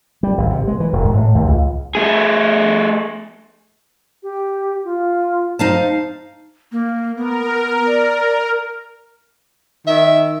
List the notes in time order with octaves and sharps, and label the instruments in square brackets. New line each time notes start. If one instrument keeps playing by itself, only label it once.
[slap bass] G3
G#1
C3
G#3
E3
E1
G#2
A2
D#2
C#2
[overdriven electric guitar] A3 G#4
[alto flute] G4
F4
[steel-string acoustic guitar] D#4 F5 A5 [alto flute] C5
[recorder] A#3
[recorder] B3 [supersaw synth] A#4
[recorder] D5
[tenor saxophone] D#3 [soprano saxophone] E5